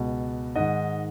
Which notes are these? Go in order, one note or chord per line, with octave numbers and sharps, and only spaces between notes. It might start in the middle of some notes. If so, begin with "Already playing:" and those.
Already playing: C#2 B2
G#2 D#3 D#5 F#5